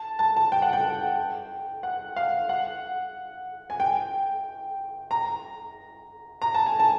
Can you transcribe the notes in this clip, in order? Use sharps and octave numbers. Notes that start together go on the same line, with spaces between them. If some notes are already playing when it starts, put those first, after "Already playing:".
Already playing: A5
A5
A5
G5
F#5
G5
F#5
F5
F#5
G#5
G5
A#5
A#5
A5
G#5
A5